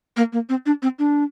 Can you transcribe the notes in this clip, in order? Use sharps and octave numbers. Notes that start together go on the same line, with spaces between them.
A#3
A#3
C4
D4
C4
D4